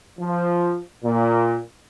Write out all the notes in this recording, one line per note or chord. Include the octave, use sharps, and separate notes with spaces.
F3
A#2